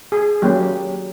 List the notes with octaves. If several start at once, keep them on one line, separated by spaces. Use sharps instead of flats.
G#4
F#3 A#3 C#4 G4